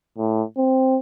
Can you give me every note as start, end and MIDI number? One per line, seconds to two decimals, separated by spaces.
0.18 0.43 45
0.57 0.99 60